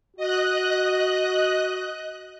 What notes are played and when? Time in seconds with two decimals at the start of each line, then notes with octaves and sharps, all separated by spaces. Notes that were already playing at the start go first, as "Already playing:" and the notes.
0.17 F#4 D#5 F#6